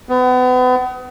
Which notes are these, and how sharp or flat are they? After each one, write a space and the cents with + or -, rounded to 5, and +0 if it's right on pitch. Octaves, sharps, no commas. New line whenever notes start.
B3 +35